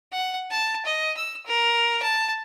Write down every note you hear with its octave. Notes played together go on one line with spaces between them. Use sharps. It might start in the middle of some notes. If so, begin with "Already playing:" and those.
F#5
A5
D#5
E6
A#4
A5